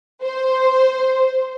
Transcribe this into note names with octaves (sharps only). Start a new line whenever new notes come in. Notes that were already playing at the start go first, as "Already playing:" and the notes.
C5